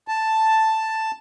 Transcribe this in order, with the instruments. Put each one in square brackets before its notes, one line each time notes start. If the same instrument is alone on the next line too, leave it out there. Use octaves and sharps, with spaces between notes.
[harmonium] A5